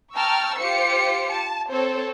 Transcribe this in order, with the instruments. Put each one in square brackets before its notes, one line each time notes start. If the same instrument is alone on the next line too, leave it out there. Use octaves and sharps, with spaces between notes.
[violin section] G5 A5 A#5 C#6 E6 F6
F4 G4 C5 C#7
A5
C4 A4 C5 C#5